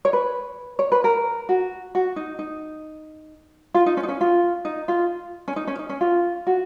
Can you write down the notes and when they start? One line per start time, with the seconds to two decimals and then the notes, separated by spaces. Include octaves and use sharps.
0.05 C#5
0.13 B4
0.79 C#5
0.92 B4
1.04 A#4
1.49 F#4
1.95 F#4
2.16 D#4
2.39 D#4
3.74 F4
3.86 D#4
3.97 C#4
4.03 D#4
4.08 C#4
4.21 F4
4.65 D#4
4.88 F4
5.48 C#4
5.56 D#4
5.67 C#4
5.79 D#4
5.89 C#4
6.01 F4
6.47 F#4